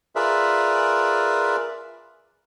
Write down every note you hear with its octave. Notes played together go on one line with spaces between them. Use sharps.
F4 G#4 A#4 B4 D5 E5